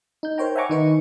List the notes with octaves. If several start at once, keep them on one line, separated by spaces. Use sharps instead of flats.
D#4 G6
A#4 C5 C#5 G5 A#5
E5 F#5 G#5 A#5 C#6 D6
D#3 D#4 B4 C#6